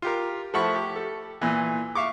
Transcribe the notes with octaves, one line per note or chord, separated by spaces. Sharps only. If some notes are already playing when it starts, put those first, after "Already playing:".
F4 G4 A#4
F3 A3 E4 F#5 B5 C#6
G4
A4
A#2 E3
E5 F5 C#6 D6